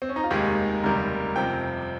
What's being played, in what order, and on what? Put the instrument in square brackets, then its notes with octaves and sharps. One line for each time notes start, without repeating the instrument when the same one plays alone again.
[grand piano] C4
C#4
D#4
F4
F1 D#2 D#3 G#3 G4
F1 D#2 C#3 G3 A#4
F2 C3 F3 G5